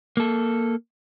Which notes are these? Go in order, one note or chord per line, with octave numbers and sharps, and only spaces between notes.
A#3 A4